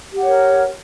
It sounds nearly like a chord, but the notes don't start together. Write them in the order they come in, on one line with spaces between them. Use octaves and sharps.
G4 F#5 C#5 A#4